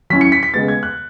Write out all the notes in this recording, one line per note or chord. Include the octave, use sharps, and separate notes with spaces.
F#3 C#4 E4 B6
C#7
B6
B6
C#3 G#3 B3 A6
G#6
F#6